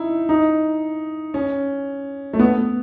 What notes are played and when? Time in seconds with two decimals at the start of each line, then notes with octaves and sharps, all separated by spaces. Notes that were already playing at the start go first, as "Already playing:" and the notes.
Already playing: D#4 E4
0.29 D#4
1.34 C#4
2.33 A3
2.39 B3